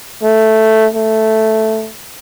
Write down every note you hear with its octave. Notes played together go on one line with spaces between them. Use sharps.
A3
A3